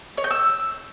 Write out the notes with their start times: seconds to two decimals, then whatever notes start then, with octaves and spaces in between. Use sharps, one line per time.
0.17 C#5
0.24 G6
0.31 E6